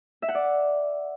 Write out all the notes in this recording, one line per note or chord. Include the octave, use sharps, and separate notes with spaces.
E5
F#5
D5